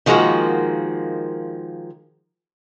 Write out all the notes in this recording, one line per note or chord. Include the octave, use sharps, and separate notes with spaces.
D#3 F3 G#3 A#3 F#4